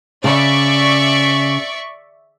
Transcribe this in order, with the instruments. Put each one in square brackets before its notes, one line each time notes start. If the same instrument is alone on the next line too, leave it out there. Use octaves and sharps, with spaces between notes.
[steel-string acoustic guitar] C#3 [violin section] D5 E5 C#6